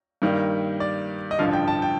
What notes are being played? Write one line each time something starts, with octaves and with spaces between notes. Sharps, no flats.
G2 D#3 G3 A#3
D5
D#5
A1 G2 D3 F3 F5
G5
A5
G5